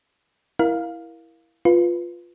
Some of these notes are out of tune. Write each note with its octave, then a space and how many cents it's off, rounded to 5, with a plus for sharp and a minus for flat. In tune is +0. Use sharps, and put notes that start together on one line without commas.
E4 +0 A#4 +15 F5 +0
F4 +0 B4 +0